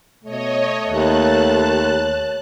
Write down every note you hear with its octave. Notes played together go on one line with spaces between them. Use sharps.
B2 A3 C#5 D#5
D#2 C#5 A5 F#6